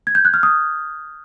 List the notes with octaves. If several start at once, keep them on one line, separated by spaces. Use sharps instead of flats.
G#6
G6
F#6
F6
D#6